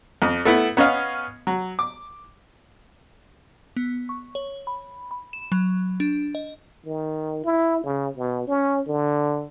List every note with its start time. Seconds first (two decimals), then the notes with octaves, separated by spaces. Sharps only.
0.22 F2
0.45 A3 B3 E4
0.77 B3 C#4 D#5 F5
1.47 F#3
1.79 D6
3.76 B3
4.09 C#6
4.35 C#5
4.67 B5
5.11 B5
5.33 E7
5.52 F#3
6.00 D4
6.35 D#5
6.86 D#3
7.44 E4
7.84 C#3
8.17 B2
8.47 C#4
8.87 D3